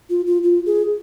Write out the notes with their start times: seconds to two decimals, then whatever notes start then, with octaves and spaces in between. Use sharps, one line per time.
0.10 F4
0.27 F4
0.44 F4
0.66 G#4